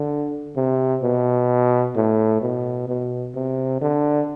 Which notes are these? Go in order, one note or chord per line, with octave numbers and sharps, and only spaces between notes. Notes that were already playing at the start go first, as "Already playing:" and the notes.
Already playing: D3
C3
B2
A2
B2
B2
C3
D3